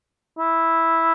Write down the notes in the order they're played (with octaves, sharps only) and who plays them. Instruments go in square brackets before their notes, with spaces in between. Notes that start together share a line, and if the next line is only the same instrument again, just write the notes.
[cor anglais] E4